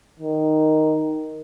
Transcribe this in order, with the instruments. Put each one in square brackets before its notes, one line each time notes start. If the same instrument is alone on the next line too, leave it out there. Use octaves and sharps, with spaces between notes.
[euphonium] D#3